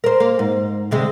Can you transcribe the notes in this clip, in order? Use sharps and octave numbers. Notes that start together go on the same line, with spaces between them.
A#4 C5
A#3
G#2
D2 C3 G#3